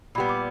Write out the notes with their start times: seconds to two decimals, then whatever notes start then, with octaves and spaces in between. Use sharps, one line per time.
0.15 A#2 B5
0.18 G3 B3
0.29 D6